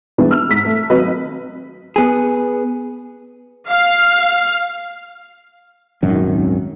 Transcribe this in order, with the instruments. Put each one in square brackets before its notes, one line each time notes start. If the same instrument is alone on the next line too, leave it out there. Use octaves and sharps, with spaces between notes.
[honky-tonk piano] E3 G3 G#3 B3 D4
E6 F6
G#2 B6
A3
G#1 F#3 B4 D#5
[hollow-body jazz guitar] B3 G#4
[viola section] F5
[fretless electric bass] D#1 G#1 F#2 D#3